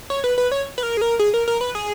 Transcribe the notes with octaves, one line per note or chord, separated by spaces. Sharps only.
C#5
B4
B4
C#5
B4
A#4
G#4
A#4
G#4
A#4
A#4
B4
G#4